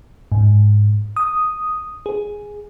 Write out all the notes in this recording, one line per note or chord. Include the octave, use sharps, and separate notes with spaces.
G#2
D#6
G#4